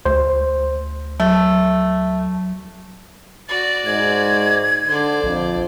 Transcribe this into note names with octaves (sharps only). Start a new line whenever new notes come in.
D2 C5
F#3 A3
F#4 D5 A6
G#2 G#6
D3 C5 D5
A#1 F2